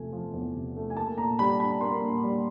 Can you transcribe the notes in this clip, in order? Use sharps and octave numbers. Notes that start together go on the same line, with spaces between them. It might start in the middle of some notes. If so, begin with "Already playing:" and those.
Already playing: E2 C3 F3 A3 G#5
F3
E2
C3
A3
G#5
A#3 A5
A#2 A#5
G3 B5
D4 B5
A#3 C6
A#2
G3